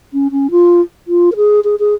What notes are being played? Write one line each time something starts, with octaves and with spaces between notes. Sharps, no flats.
C#4
C#4
F4
F4
A#4
G#4
G#4
G#4